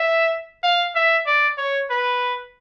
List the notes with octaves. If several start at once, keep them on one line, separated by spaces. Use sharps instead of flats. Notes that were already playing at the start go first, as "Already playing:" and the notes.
Already playing: E5
F5
E5
D5
C#5
B4